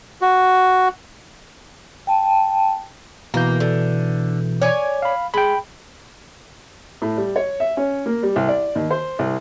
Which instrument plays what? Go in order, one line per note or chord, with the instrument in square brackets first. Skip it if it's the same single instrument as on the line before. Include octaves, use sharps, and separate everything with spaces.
[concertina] F#4
[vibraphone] G5 A5
[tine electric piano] B2 E3 G6 [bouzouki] A#3
[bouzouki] D3
C#5 D5 G#5
[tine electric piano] F5 B5
[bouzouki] G#3 [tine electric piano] G5 B5
[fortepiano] A2
G3
C#5
E5
C#4
A#3
G3
C2
D5
D#2
C5
C2